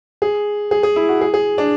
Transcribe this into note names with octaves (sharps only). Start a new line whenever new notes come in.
G#4
G#4
G#4
E4
F#4
G#4
G#4
D4